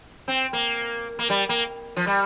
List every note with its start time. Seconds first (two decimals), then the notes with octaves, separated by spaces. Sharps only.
0.28 C4
0.53 A#3
1.19 A#3
1.30 G3
1.49 A#3
1.96 F3
2.07 G3